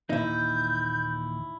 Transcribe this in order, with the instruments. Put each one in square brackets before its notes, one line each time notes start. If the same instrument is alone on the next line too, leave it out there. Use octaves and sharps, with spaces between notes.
[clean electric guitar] D#2 A#2 E3 [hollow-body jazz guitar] D#4 E4 [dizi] G6